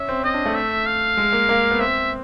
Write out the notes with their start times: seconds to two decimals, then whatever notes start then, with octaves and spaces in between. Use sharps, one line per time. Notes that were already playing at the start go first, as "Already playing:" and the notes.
Already playing: C#4 E5
0.09 C4
0.24 C4 D#5
0.34 D4
0.46 A3
0.55 E5
0.86 F5
1.17 G#3
1.33 A#3
1.49 A#3
1.71 B3
1.79 C4 E5